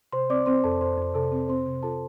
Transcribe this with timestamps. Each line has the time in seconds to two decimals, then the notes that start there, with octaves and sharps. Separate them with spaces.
0.12 C3 C5 C6
0.30 C4 D5 D6
0.46 C4 C5 C6
0.64 F2 A4 A5
0.81 F2 C5 C6
0.97 F2
1.14 C3 A4 A5
1.32 C4
1.48 C4 C5 C6
1.66 C3
1.83 F4 A4 A5